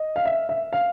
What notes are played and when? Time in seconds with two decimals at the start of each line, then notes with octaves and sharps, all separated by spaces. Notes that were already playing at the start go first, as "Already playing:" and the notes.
Already playing: D#5
0.16 F5
0.26 E5
0.49 E5
0.73 F5